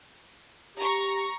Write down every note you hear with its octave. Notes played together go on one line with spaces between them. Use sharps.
G4 A#5 C#6